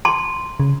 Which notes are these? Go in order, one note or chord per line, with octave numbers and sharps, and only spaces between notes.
A5 C6
C#3